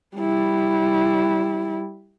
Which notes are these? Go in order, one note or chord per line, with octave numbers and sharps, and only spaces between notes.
G3 E4